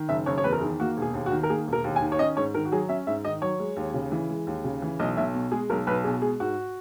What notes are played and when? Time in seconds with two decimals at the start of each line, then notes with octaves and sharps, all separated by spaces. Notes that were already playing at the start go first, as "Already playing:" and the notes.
Already playing: D#3
0.09 F#1 E5
0.26 F#1 C#5
0.38 C#5
0.44 E2 B4
0.53 A#4
0.61 D#3 G#4
0.80 A#3 F#4
0.97 E1 G#4
1.14 D#2
1.26 F#4
1.31 D#3
1.43 A#4
1.49 A#3 G#4
1.67 E1
1.73 A#4
1.84 D#2
1.96 G#5
2.01 D#3
2.12 C#5
2.19 C#4 D#5
2.37 G#2 C#5
2.54 D#3 A#4
2.65 F#4
2.72 F#3 G#4
2.89 C#4 E5
3.07 G#2 E5
3.25 D#3 D#5
3.42 F#3 C#5
3.60 G#3
3.76 D#2
3.94 C#3
4.12 E3
4.29 G#3
4.47 D#2
4.64 C#3
4.82 E3
4.99 B1 D#5
5.17 B1 E5
5.34 B2
5.52 G#3 G#4
5.70 B1 A#4
5.87 B1 B4
6.04 B2 G#4
6.22 G#3 G#4
6.40 G#2 F#4